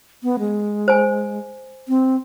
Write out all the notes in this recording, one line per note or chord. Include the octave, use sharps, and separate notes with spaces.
B3
G#3
C5 G#5
C4